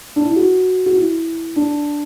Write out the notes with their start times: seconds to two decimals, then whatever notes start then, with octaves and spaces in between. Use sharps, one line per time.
0.16 D4
0.25 E4
0.36 F#4
0.86 F#4
0.96 E4
1.56 D4